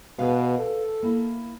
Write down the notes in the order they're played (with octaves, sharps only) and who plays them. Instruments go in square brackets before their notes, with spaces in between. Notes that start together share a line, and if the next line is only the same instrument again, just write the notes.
[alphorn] B2 [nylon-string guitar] G#4 B4 F5
[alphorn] A4
[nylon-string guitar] A#3 E4